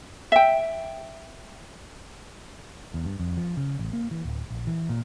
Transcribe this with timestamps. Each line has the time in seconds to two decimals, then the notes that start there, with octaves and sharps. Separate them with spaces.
0.32 E5 G5
2.94 E2
3.05 G2
3.20 F2
3.37 F3
3.57 C#3
3.79 A1
3.93 A#3
4.11 E3
4.25 D1
4.50 A#1
4.67 E3
4.89 A#2